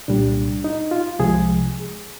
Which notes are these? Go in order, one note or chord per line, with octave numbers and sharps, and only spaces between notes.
C2 A#2 G3 D4
D#4
F4
C2 C3 F3 G#3 G#4